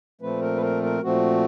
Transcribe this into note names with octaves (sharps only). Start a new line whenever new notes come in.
A#2 F3 A3 C4 B4
A#4
B4
A#4
A#4
A#2 F3 A3 C4 F#4